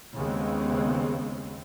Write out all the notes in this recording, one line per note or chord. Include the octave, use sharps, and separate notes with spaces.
D#2 C#3 G#3 B3 C4